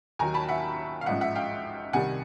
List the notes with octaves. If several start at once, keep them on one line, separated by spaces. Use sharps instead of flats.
D#2 D#3 F#3 G#5 A#5
A5 B5
E5 F#5
F5
A1 G#2 F3 G#3 E5 F#5
E5 F#5
F5 G5
C2 C3 D#3 G3 F#5 G#5